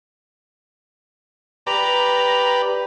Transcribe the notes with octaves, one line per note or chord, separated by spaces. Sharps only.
G4 B4 D5 A#5